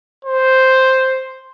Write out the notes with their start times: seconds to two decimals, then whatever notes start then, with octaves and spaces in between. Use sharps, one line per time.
0.25 C5